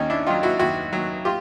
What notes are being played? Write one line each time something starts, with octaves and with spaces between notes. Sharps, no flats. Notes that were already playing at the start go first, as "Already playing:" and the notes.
Already playing: D#2 C#4 D#4
D4 E4
D#3 F#3 D#4 F4
E4 F#4
D#2 E4 F#4
D#3 F#3
F4 G4